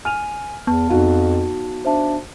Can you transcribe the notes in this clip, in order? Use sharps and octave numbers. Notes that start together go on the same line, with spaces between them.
G#5 F6 D#7 F7
E2 B3 A5
F2 D#4 F#4 F5
D4 C5 E5 A5